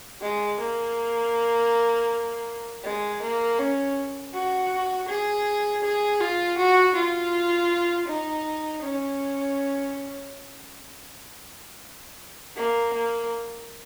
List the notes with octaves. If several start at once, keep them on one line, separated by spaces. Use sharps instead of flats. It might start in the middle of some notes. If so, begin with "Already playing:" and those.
G#3
A#3
G#3
A#3
C#4
F#4
G#4
G#4
F4
F#4
F4
D#4
C#4
A#3
A#3